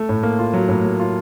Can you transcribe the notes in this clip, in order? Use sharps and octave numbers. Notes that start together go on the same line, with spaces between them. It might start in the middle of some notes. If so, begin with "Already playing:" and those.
Already playing: A3
A2
A#3
F4
F#3
A2
A#3
F4